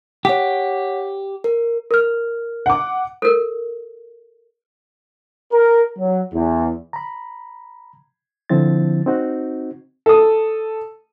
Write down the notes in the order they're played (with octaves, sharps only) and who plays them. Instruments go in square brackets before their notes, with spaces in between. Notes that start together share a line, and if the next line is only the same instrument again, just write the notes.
[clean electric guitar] G4 [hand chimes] C#5 F#5 B6
[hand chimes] A#4
[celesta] A#4 F6
[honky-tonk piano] F#5 D6
[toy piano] A4 A#4
[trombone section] A#4
F#3
E2
[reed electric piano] A#5 B5
D3 F3 C4 E4 A6
C4 D#4 F#4
[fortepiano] A4 D#6